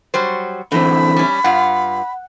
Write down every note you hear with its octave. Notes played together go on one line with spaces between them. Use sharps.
F#3 G3 C5
A2 D3 E3 C4 B5
G3 C#4
G2 F4 F#5